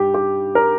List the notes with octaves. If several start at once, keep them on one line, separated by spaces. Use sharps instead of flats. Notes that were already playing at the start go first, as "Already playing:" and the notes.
Already playing: G2 G4
G4
A#4